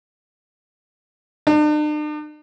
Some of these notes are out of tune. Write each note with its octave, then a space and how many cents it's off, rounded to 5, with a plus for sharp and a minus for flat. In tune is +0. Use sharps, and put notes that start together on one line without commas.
D4 +45